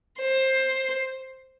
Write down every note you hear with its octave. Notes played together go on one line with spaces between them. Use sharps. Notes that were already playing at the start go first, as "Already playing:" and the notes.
C5